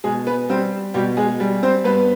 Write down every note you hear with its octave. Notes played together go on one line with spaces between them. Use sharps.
B2 G#3 G#4
B3 B4
G3 C4 C5
B2 G3 G4
G#3 G#4
G3
C4 C5
G2 B3 B4